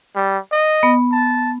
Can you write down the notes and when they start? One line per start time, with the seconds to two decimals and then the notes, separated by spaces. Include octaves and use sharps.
0.16 G3
0.52 D#5
0.83 B3
1.12 A5